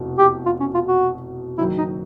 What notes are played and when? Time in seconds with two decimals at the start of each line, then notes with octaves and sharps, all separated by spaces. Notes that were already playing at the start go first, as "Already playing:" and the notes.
Already playing: F1 E2 B2
0.18 G4
0.46 F4
0.60 C#4
0.74 F4
0.88 F#4
1.58 F#1 F#2 D#3 F#3 E4
1.78 D#4